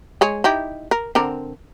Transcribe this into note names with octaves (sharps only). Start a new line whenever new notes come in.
G#3 G#4 C#5
D#4 E4 G4
A#4
D3 C4 A#4